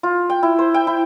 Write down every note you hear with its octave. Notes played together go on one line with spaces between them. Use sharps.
F4
G5
E4
C5
G5
E4